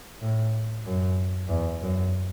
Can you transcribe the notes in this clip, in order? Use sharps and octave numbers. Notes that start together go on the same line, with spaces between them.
A2
F#2
E2
F#2